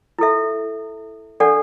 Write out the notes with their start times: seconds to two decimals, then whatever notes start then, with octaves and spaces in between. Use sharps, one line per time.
0.19 E4 A4 E5
1.40 D4 A4 D5 F#5